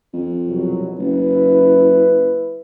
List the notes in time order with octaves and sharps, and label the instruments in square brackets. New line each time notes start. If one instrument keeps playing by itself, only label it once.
[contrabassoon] F2
[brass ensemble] C2 B2 F#3
[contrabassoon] F#1 [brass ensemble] E4 B4